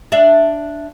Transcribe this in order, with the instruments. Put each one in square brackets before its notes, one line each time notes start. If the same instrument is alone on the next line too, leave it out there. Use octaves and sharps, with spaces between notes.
[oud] D4 E5